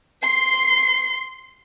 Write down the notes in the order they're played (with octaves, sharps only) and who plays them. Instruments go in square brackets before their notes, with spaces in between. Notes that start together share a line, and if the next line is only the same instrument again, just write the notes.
[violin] C6 C7